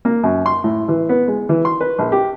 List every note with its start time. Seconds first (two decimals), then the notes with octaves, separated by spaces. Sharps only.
0.05 A#3
0.23 F#2
0.46 C6
0.64 A2
0.88 E3
1.09 B3
1.28 G#3
1.49 E3
1.65 C6
1.81 B4
1.99 A#1
2.12 G4